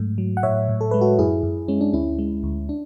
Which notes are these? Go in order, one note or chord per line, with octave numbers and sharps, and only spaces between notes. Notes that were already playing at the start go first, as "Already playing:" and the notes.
Already playing: G#2 F#3 A3
F#3
F#5
A2 C#5 E5
A2
A4
G#3 B4
F#4 A4
F#2 E4 G#4
F#2
G#3 C#4
D4
D2 C#4 E4
G#3
D2
D4